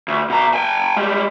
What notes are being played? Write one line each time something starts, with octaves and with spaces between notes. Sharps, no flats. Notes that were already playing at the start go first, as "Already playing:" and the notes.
D2
B2 A#5
G5 G#5
G3 G#3